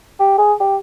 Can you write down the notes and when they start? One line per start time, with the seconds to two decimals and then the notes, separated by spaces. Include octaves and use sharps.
0.20 G4
0.38 G#4
0.60 G4